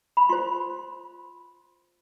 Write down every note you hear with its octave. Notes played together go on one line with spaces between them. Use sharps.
B5
F4 C5 C6